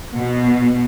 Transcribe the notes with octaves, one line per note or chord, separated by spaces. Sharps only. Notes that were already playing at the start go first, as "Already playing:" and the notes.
B2